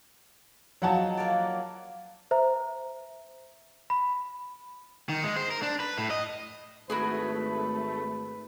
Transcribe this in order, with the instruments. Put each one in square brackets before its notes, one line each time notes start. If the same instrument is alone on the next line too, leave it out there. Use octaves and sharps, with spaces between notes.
[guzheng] F3 D#4 [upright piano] F#3 F#5 A5
[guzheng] A#3 C#5 D5
[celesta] C5 E5 A#5
B5
[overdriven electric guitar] D#3
G#3
C5
A#4
D4
B4
A2
D#5
[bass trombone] G#1 [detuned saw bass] A3 [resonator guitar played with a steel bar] E4 F#4 G#4 [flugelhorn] B4